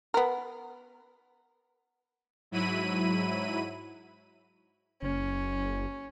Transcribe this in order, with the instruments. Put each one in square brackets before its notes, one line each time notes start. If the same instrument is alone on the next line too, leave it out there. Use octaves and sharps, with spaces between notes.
[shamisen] B3 A#4
[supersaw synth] G#2 F#3 E4 B5 D#7
[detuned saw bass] F#1 [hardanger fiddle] C#4